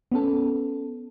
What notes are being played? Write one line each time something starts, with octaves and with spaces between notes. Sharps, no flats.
B3 C#4 A4